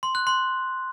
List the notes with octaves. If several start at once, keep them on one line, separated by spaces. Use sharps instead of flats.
C6
F#6
C6